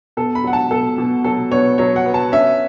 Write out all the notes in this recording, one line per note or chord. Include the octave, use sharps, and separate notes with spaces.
B2 A4
B5
F#3 F#5
A5
B2 A4
B2
F#3 A4
B3 C#5
F#3 C#5
F#5
B3
A5
C#4 E5